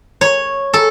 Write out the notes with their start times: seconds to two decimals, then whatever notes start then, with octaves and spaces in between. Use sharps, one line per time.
0.21 C#5
0.73 A4